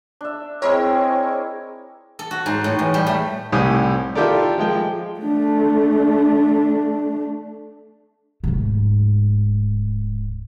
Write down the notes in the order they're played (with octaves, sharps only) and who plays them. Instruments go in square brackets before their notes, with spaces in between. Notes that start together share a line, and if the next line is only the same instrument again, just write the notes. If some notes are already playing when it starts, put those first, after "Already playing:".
[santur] D4 E5
[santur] G#3 E4 A#4 [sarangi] C4 [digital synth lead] C#5
[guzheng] A4
F#4
G#2
A2
E2
G3
A3
[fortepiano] C2 A2 G4 G#5 D#6
E4 F4 G4 A4 A#4 D5
F3 G#3 G5
[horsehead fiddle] A3 D4
[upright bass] D1 G#2